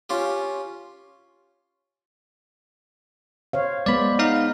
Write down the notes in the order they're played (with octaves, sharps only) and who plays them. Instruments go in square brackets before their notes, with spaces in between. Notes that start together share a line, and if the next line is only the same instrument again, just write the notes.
[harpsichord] C#4 F4 G4
[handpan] C5 C#5 F5
[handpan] G#3 B3 C5 [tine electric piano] D5 B5
[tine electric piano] D#4 F5